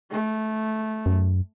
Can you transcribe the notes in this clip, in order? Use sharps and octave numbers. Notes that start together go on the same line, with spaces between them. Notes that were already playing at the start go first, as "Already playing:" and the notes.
A3
F#2